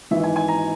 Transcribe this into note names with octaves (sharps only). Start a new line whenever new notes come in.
G#1 G#2 E3 E5
G#5
G#5
A#5